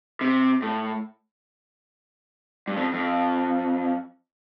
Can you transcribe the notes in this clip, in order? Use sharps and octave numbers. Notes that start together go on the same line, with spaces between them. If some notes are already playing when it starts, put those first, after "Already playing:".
C3
A2
G2
F2
F2